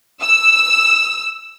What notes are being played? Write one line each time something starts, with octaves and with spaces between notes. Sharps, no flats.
E6